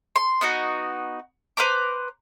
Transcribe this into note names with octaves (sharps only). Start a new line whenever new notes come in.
C6
B3 D#4 F#4
B4 C5 A#5 D6